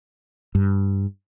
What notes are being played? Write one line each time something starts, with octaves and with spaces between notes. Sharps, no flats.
G2